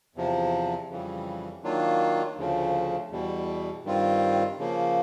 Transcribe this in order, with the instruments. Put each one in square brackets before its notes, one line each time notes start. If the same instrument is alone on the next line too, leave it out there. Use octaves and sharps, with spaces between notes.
[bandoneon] E2 C3 F3
F2 C#3 E3 G3
D#3 F#3 A#3 D4 F4
D2 C#3 F3
E2 B2 G3
G2 D#3 G3 C4 F4
C#3 F3 A#3